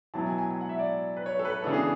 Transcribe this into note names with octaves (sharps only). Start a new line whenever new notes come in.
B2 F#3 B3 E4 A5
G#5
G#5
G#5
F#5
E5
D5
B4
C#5
A4
B4
C#3 E3 B3 D4 A4
G#4